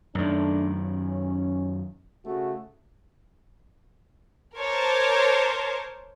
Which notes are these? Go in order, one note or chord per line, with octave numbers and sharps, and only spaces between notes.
F#2 D#3 A3 D4
C#4
C#3 A3 F#4
A#4 C5 C#5 A5 D6